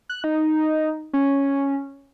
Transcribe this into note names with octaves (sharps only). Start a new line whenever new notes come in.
F#6
D#4
C#4